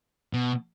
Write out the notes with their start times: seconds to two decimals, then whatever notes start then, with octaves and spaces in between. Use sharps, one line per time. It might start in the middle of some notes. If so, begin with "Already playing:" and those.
0.33 B2